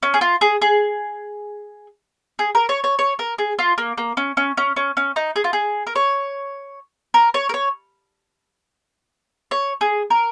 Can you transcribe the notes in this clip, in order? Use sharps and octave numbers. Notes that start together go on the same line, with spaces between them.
C#4
G#4
F4
G#4
G#4
G#4
A#4
C#5
C#5
C#5
A#4
G#4
F4
A#3
A#3
C#4
C#4
C#4
C#4
C#4
D#4
G#4
F4
G#4
A#4
C#5
A#4
C#5
A#4
C#5
C#5
G#4
A#4